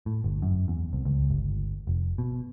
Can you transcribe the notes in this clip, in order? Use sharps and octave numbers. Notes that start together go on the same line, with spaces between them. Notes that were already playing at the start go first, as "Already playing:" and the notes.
A2
G1
F#2
E2
C2
C#2
G1
F1
B2